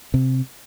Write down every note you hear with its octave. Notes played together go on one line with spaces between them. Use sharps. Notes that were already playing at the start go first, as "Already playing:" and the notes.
C3